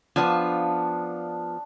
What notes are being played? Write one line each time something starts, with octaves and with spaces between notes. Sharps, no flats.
F3 B3 D4 F5